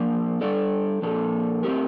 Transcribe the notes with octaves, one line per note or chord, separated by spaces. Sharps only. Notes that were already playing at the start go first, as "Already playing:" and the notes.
Already playing: F3 A#3 D4
G3 D4 A4 D5
A#2 F3 A#3 D4 A4
A3 C4 G4 A#4